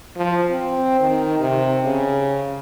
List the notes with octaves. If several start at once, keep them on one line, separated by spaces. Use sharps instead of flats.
F3
C4
D#3
C3
C#3